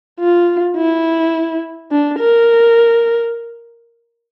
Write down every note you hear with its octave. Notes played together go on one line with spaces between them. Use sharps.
F4
E4
D4
A#4